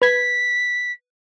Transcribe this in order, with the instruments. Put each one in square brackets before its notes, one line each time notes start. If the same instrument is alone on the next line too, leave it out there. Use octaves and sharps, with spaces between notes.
[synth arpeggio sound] B4 G#6 [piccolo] B6